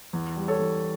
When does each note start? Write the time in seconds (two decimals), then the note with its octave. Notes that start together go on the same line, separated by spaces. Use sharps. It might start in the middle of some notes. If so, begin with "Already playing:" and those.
0.13 E2
0.36 G3
0.48 A4 C#5
0.60 E2